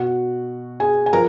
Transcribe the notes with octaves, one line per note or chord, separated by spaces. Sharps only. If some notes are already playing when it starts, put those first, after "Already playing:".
Already playing: B2 F#4 F#5
G#4 G#5
G#5
F3 A#4 A#5